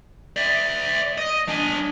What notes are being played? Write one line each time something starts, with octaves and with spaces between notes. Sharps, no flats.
D5 E5
D#5
D4 G#5